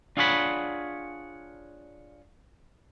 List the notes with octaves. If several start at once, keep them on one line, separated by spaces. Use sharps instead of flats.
D4 F4 G#4 C#5 F#5 B5